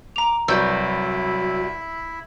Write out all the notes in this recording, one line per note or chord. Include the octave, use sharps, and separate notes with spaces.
A#5 D6 F7
C2 F#3 E4 B4 D5 E5 E6 G6